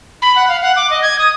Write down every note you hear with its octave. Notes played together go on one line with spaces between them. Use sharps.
B5
F#5
F5
F#5
D6
D#5
G#6
D#6